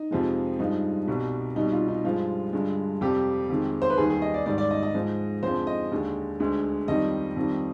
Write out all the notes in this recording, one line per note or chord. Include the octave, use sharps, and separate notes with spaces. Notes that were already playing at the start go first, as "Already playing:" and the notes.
Already playing: D#4
F2 C3 F3 G#3
G2 F3 G#3 D#4
C2 B2 G3
C2 B2 G3 D#4
F4
D#4
G2 F3 G#3 F4
G2 D3 G#3
F2 C3 G3 G4
F2 D#3 G#3
C5
B4
D#2 D#3 G3 G#4
G#4
D#5
D5
G#2 D#3 G3 D5
D5
D#5
D#5
G#2 F3 G#3
F2 D3 F3 G#3 C5
D#5
D#2 D3 G#3
D2 D3 G#3
F2 D#3 G3 D#5
F2 D#3 G3